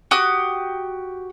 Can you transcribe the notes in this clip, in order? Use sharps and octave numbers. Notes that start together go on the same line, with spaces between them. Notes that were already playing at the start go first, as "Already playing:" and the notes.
F#4 G4 D#6